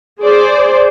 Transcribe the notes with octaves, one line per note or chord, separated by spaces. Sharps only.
G#4 C5 D5